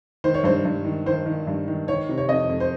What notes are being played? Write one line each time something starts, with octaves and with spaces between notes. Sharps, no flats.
D#3 C5
C#5
G2 C5
G2
D#3
D#3 C5
D#3
G2
D#3
D#3 C#5
C3
C#5
F2 D#5
F2
C5